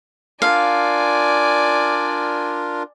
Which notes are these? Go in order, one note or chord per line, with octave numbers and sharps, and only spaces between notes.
D4 F4 A#4 D5 F5 G#5